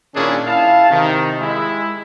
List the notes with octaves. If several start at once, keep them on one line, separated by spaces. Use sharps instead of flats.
A#2 D#3 C#4 D4 E4 G#4
E4 F5 A5
C3 D#3
G#3 E4